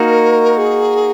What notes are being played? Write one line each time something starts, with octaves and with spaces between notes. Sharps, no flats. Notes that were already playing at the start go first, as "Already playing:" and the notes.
Already playing: A#3 D#4 F#4 A#4
G#4